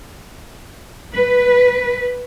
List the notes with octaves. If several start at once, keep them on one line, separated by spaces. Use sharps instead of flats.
B4